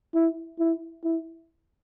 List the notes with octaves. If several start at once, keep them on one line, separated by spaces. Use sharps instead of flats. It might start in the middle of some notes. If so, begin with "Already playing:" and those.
E4
E4
E4